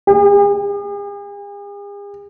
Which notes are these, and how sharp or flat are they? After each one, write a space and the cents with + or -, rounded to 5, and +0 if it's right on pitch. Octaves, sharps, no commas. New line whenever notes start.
G#4 -45